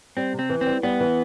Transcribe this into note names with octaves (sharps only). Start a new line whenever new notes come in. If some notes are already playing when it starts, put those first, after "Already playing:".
G3 C4
C3
C4
E3
C4
G3
G3 B3
E3